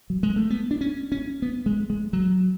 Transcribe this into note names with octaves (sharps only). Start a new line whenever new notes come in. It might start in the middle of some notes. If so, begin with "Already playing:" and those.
F#3
G#3
A3
B3
D4
C#4
C#4
B3
G#3
G#3
F#3